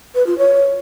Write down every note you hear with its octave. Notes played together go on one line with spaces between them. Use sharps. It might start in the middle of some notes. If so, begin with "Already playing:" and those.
B4
F4
C#5